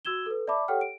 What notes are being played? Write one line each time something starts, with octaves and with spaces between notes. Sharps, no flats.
F#4 E6 G#6 E7 G7
A4 B4
D5 E5 A5 B5 D6
G4 A4 C#5 F#5 G5 F6
D7